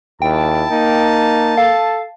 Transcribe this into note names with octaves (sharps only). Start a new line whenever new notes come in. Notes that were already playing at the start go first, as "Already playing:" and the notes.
D#2 E4 G5 A5
A#3 D#4
A4 F5